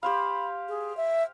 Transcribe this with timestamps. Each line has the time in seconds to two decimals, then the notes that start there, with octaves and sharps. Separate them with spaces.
0.03 G4 C5 F5 B5
0.68 G#4
0.97 E5